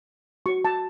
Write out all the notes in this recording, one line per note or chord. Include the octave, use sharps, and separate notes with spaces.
F#4 C#5 C#6
A5